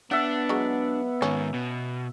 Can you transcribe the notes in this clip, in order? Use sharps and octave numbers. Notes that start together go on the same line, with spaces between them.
B3 D4 E5 F#5
F#3 G#3
G#2 D#3 C#4
B2